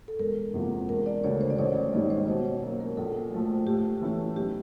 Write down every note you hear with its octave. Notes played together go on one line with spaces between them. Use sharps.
A4
E1 A#4
E2 C3 F3 A#3
E1 A#4
D5
D2 C#3 C#5
C5
D5
A1 C#5
D5
D5
G#2 D#3 G3 C#5
C5
B2 C5
C#5
F#3 A#3 A#4
A#4
A#1 A4
A2 F3 A3
A2 G4
E3 A3 C#4 E4
B1 G4